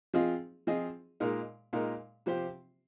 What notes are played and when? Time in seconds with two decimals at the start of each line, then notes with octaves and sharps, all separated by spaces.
0.14 F3 C4 F4 G#4 D#5
0.67 F3 C4 F4 G#4 D#5
1.20 A#2 G#3 D#4 A#4
1.73 A#2 G#3 D#4 A#4
2.26 C3 F3 C4 G4 C5